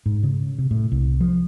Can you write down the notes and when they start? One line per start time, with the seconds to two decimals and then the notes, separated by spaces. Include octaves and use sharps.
0.06 G#2
0.23 C#3
0.58 C3
0.71 A2
0.92 C2
1.20 F3